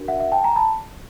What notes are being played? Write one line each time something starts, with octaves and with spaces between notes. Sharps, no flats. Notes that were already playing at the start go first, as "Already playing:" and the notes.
Already playing: D4 F#4 A#4
E5 F#5
E5 F#5
G5 A5
G#5 A#5
A5 B5